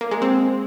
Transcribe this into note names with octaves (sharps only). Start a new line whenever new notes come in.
A#3
G#3
C4